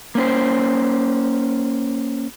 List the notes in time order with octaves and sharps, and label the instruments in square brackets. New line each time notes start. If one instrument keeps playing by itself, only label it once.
[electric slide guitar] A#3 C#4 C5